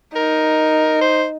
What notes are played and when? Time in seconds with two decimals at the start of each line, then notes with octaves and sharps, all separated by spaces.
0.16 D#4 A#4
1.01 C5